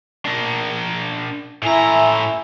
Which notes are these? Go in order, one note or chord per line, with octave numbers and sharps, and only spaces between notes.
D4 A#4
A2 E4 E5 G#5 A#5